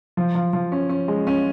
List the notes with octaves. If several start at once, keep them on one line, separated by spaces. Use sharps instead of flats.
F3
F3
F3
C#4
C#4
G#3
C#4